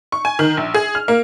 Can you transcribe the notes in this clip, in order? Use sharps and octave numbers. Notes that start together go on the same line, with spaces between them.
C#6
G#5
D#3
A#1
G#4
F6
A#3